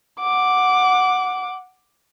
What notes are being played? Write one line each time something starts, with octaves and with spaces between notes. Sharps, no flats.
F#5 D6